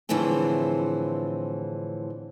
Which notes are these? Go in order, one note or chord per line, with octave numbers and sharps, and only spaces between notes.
A2 D3 E3 F3 C4 G#4